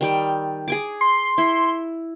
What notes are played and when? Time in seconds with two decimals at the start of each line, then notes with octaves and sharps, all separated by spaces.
0.01 D#3 G3 G5
0.68 G#4 G#5 D6
1.01 C6
1.38 E4